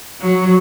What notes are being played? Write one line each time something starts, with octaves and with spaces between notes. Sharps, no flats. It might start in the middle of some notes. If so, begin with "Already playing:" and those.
F#3